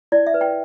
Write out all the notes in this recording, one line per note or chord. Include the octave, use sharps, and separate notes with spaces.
E4 D5
E5
B4
G5